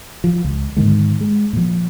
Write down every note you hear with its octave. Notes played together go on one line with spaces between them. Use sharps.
F3
C#2
G#2 D3 D#3 G#3
G#3
A#2 F3